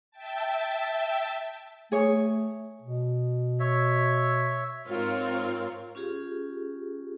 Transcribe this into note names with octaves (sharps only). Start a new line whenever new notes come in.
E5 G5 A5
A3 G#4 C#5
B2
C#5 E5
G#2 C4 F4 A#4 C#5
C#4 F4 G4 G#4